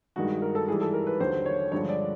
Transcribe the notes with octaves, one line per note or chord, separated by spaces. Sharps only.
G2 D#3 G#3 F#4
A#4
A4
G#2 E3 G3 G#4
A4
A#4
B4
D#2 D3 F#3 C5
C#5
G2 D3 F3 G#3 C#5
D5